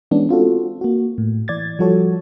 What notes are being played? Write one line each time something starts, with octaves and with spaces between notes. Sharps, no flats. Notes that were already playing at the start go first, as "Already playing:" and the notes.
E3 G#3 B3 C#4 D4
C4 F4 F#4 A4
A#3 F#4
A2
E3 D5 G#6 A6
F3 G3 F#4 A4 C#5